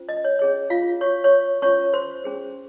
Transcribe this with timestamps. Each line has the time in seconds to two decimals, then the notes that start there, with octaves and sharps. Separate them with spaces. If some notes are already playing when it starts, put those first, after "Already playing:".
Already playing: C#4 F4 C5
0.09 D#5
0.24 C#5
0.39 C#4 G#4 C#5
0.70 F4 F5
1.01 F#4 C#5 C#6
1.24 C#5 C#6
1.62 C#4 F4 C5 C#5 C#6
1.93 C5 C6
2.24 C#4 G#4 C5